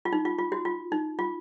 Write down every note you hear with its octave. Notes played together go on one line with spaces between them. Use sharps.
F4
D#4
F4
F4
F#4
F4
D#4
F4